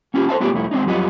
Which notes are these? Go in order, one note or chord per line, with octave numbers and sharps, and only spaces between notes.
A#3 C#4 F4 G4
A4 C5 E5 A5
A3 B3 C4 D4 F4 G4
C2 F2 A3 E4
G#3 C4 D4 D#4
F2 F#3 G3 F4 D#5 F#5